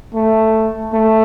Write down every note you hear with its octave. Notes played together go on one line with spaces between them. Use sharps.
A3
A3